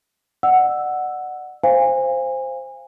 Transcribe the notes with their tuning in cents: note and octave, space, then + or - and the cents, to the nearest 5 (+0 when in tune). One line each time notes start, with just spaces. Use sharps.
D5 +40 F#5 +0 E6 +0
C5 +0 F5 +0 G#5 -30